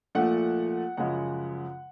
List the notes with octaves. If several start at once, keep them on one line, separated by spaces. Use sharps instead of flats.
A#2 F3 A3 F#5
F#2 C#3 F3 G#3 F#5